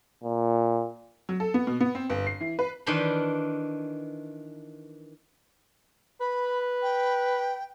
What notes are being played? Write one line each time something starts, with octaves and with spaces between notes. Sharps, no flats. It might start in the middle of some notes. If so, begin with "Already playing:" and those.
A#2
F#3
A4
B3
B2
B3
C4
G1
C7
E3
B4
D#3 E3 D4 C5 B5 C6
B4 B5
G5